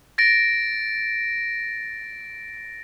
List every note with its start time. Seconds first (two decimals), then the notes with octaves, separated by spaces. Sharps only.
0.18 A6 A#6 D7